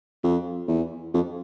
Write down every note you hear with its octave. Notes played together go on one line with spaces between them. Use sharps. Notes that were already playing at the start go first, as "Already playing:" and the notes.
F2
E2
F2